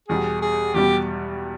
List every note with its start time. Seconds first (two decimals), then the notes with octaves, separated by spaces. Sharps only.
0.08 E2 B2 G3 G#4
0.42 G#4
0.74 E2 B2 G3 G4